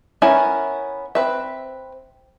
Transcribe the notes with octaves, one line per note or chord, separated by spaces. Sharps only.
B3 C#4 E4 A#4
C4 B4 E5